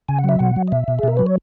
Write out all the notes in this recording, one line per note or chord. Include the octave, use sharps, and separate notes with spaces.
C#3 G#5
F#5
F#3 E5
B2 F#5
F#3
D#5
B2 E5
B2
G#4
B2 A#4
F#3 B4
C#5